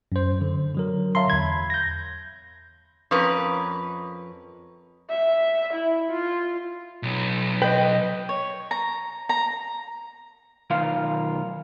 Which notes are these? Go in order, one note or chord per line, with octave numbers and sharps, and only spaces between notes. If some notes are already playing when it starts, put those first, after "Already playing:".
F#2 C5
D3
D3 F#3 A#4
C#5 E5 F5 A5 A#5 C6
E2 B5 G#6
G6 A#6
F2 C#4 A#4 B4
E5
E4
F4
B1
B4 D#5 G5
C#5
A#5
A#5
B1 D#3 F4 A#4 F5 C6